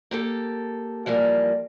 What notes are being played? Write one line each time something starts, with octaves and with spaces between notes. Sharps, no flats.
A#3 G4 A4
E3 F3 G3 A#3